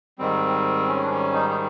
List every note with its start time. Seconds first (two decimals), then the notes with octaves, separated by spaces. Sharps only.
0.19 G#2 D#3 G3 C4
0.88 C#4
1.03 D4
1.11 C#4
1.34 D#4
1.50 D#4